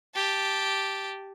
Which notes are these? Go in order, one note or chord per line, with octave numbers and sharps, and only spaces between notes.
G4 A5